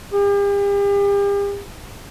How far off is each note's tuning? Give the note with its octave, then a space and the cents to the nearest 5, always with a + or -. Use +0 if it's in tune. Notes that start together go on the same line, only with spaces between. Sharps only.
G4 +40